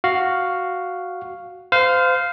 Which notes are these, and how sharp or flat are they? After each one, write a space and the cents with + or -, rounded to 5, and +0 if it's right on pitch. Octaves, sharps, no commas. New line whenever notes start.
F#4 +0 F5 +0
C5 -30 F5 +0